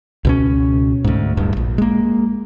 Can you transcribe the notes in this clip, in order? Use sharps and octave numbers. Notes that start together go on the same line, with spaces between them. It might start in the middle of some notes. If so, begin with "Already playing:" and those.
C#2 B2 C#4
D2 G#2
D1 G2
A#1
G#3 A#3